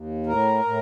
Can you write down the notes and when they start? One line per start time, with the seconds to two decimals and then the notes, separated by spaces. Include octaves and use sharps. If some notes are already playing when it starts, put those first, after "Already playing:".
Already playing: D#2
0.26 A2 A#4
0.65 A2